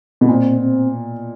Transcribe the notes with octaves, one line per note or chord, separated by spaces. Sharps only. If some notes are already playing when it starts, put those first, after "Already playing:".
B2
A#2 C4
C4